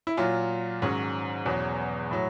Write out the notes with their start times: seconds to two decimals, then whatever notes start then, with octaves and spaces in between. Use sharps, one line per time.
0.07 E4
0.17 A#2 F#3 F4
0.82 G#2 D#3 F#3 C#4
1.46 E2 B2 F#3
2.11 A2 F#3